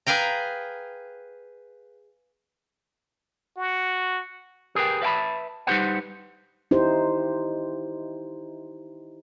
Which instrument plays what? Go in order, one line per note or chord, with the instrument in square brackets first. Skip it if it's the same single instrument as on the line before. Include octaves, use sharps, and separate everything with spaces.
[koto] G#4 B4 F5 G5 A#5
[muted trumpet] F#4
[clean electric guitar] G4 G#4 A#4 B4 G5
B4 E5 F5 G5 A5 B5
G3 D#4 G4 B4 C5 F#5
[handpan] D#4 E4 G4 C5